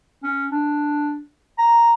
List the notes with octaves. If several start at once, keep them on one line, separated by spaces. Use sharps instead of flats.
C#4
D4
A#5